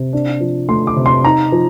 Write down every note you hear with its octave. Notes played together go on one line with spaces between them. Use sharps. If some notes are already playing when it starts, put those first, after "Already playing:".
Already playing: C3
D4
F3
A3 C6
D6
C3
C6
D#4 A#5
F3